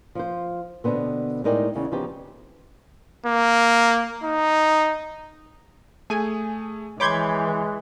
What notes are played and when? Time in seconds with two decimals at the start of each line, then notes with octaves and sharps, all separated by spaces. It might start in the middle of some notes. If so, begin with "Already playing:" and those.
0.15 F3 C5
0.84 B2 D3 B3 C4
1.44 A2 G#3 D#4 A#4 D5 G5
1.75 E2 C#3
1.91 C#3 F3 B3 C4 D#4 G4
3.26 A#3
4.24 D#4
6.10 A3 G#4 G#5
7.00 E3 G#3 C#5 B5 C6 D6 G6 G#6